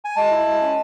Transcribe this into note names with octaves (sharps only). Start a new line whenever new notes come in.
G#5
G#3 A5
E4
G#3
C#4